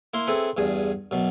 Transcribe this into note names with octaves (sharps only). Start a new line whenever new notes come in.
A#3 E4 C6
C4 E4 G#4 A4 B4
E2 G2 G#4 G#5
F#2 B2